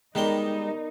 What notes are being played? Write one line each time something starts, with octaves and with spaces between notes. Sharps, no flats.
D#3 G3 G#3 B3 D#4 A#4 D5 C6